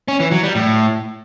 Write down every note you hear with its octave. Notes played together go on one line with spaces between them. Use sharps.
C#4
E3
F#3
G3
A2